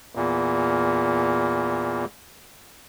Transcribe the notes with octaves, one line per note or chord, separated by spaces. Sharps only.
E2 A#2